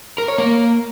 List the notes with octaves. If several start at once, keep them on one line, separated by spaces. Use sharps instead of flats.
A#4
C#5
A#3